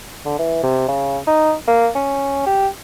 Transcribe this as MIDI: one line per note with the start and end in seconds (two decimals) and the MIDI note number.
0.26 0.34 50
0.39 0.62 52
0.63 0.86 48
0.88 1.18 49
1.27 1.53 63
1.68 1.89 58
1.95 2.42 61
2.46 2.68 67